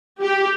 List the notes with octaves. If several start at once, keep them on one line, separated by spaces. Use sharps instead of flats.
G4